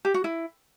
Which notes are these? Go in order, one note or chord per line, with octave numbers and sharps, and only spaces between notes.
G4
F#4
E4